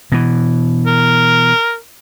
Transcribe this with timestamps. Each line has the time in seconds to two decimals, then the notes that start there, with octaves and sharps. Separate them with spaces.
0.12 B2 E3
0.86 A#4